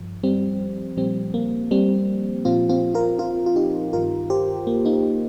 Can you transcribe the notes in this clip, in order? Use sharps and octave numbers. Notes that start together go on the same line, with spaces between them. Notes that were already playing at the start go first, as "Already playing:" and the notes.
Already playing: G2 F3
G3 C4
A#2 F3 G3 C4
A#3
G3 C4
A#2 F3 C4 F4
C4 F4
F4 A#4
F4 A#4
F4
D#4 G4
G2 D#3 F4 A#4
G4 C5
A#3
A#3 D#4